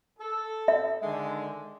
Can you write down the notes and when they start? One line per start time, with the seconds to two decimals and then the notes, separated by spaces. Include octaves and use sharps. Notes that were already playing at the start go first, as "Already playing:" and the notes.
0.19 A4
0.68 E5
1.02 D3 D#3 G#3